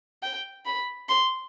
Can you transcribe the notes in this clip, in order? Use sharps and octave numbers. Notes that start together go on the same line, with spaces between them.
G5
B5
C6